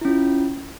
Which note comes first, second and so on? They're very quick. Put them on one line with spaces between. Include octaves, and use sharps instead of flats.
E4 C#4 F4